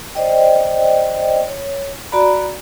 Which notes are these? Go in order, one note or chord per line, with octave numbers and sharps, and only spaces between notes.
C5 D5 D#5 G5
C#5
F#4 D5 A#5 B5